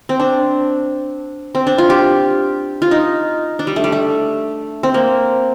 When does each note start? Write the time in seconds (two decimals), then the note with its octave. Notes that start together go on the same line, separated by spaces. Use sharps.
0.09 C4
0.20 D4
1.55 C4
1.67 D4
1.78 F4
1.90 G4
2.82 F4
2.91 D#4
3.59 D4
3.67 G3
3.76 A3
3.84 G3
3.92 A3
4.83 C4
4.94 A#3